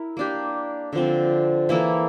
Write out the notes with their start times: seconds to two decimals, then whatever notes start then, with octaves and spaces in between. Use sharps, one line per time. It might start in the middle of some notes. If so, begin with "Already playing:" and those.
Already playing: E4 A#4
0.17 A#3 D4 G4
0.93 D3 F3 C4
1.69 E3 A#3 E4 A4